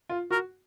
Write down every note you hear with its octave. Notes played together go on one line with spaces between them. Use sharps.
F4
F#4 A#4